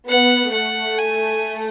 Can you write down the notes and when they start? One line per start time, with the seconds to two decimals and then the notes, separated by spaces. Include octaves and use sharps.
0.09 B3 F#5
0.53 A3 F#5
0.99 G#5